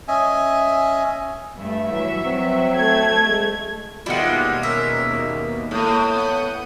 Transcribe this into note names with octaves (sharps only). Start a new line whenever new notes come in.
C#4 D#5 E5 G#5
G2 A3 E5
E3 F#3
C4
A3 G#6
G#3
D#2 B2 G3 G#3 E4 F4 G4 F#5
C#4 A#4 E5
A#3
A2 G#3 A#3 D#6 G6 D#7
B3 F#5